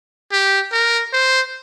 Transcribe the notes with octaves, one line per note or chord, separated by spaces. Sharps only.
G4
A#4
C5